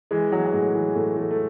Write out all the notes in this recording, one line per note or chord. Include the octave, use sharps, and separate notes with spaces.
E3 G#3
E3 F#3
F#3
A2 G#3
E3
A2 A3
E3 A3
A3